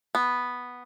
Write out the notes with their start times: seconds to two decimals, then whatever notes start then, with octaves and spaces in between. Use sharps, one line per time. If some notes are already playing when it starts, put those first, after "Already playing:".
0.15 B3